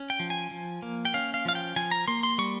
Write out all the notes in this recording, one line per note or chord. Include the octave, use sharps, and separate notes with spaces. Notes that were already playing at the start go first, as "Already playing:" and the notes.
Already playing: C#4
G5
F3
G#5
F3
A#3
G5
C#4 F5
F5
F3 F5
G5
F3 G#5
A#5
A#3 C6
C6
G3 C#6